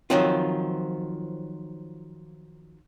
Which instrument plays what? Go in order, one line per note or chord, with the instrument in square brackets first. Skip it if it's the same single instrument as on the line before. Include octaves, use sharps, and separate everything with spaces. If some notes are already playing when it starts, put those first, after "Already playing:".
[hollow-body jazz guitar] D#3 F3 F#3 C4 F4